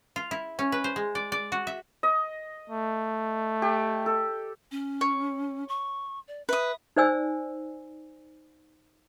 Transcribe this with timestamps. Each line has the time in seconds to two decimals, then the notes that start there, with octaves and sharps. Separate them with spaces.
0.16 F4
0.31 E4
0.59 C#4
0.72 B4
0.84 C5
0.96 G#3
1.15 D5
1.32 D5
1.52 F#4
1.67 E5
2.03 D#5
2.70 A3
3.62 G4
4.06 A4
4.71 C#4
5.01 C#5
5.69 C#6
6.28 D5
6.49 B4 E5 D#6
6.96 D#4 C5 D5 G#5 E6